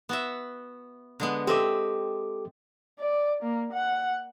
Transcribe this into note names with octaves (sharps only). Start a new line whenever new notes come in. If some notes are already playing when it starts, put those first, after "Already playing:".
B3 F#4 E5
D3 G#3 B3
C4 G4 A4 D#5 E5 D6
D5
A#3
F#5